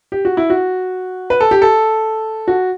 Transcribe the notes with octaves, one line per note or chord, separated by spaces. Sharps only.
G4
F#4
E4
F#4
B4
A4
G4
A4
F#4